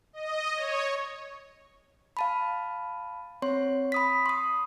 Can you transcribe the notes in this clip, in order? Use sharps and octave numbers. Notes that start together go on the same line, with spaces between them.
D#5
C#5
F5 A5 B5
C4 C#5 C6
B5 D#6 B6
C6 D#6